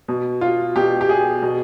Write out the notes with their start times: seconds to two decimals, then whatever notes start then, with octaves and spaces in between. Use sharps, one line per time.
0.08 B2
0.41 F4
0.76 B2 G4
1.01 G4
1.09 G#4
1.42 B2